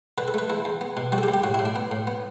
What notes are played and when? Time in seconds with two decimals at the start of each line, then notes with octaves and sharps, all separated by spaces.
0.18 D3 B4
0.28 A4
0.34 A3 B4
0.50 E2 E4
0.65 E2
0.81 B3
0.97 B2
1.12 G3 F#4
1.18 A4
1.23 G4
1.28 D2
1.34 G4
1.44 A2 F#4
1.54 E4
1.59 A2
1.65 D4
1.76 B3
1.91 A2
2.07 B3